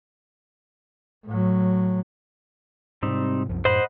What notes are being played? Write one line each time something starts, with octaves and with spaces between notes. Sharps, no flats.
A2 F#3
G#2 C3 G3 C4 D#4
C2 F#2 F3
F#2 A2 C5 D#5 F#5 B5